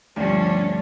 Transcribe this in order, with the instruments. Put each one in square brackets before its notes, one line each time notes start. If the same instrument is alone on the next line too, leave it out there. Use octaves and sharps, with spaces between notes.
[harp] D2 G2 [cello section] F3 C#4 D4